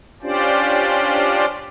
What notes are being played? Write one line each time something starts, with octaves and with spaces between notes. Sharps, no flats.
C#4 D4 F4 G4 C5 D5